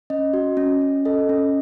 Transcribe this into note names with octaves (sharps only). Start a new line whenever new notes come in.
C#4 D#5
F#4
C#4
C#4
A4 D#5
C#4